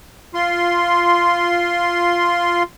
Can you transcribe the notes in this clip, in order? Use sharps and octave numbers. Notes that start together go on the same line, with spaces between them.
F4 C6